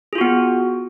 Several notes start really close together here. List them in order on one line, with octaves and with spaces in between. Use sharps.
G#4 F4 F#4 B3